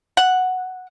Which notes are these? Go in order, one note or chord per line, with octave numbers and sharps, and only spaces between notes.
F#5